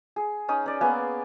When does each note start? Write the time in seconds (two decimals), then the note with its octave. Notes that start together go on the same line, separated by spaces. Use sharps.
0.16 G#4
0.49 C#4 D#4 D#6
0.66 C#4 D5
0.81 A#3 B3 G#4 G#5